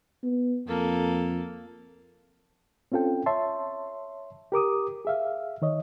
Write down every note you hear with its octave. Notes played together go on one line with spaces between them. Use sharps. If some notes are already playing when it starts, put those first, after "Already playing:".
B3
F2 A#3 A4
C4 C#4 F4 A4 G5
C#5 E5 A5 C6
G4 A#4 D6 D#6
G#4 E5 F5
D#3 C#5 D#5